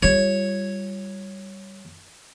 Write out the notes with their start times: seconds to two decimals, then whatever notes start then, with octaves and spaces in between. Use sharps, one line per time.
0.03 G3 F4 C#5